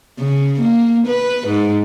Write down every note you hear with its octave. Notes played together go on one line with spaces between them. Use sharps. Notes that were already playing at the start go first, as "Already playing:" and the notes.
C#3
A#3
B4
G#2